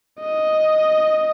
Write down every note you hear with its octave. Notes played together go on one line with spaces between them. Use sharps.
D#5